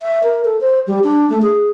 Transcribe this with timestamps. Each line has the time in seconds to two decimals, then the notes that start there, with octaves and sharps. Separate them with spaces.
0.02 E5
0.23 A#4
0.45 A4
0.61 C5
0.87 G3
1.04 D4
1.30 A3
1.42 G#4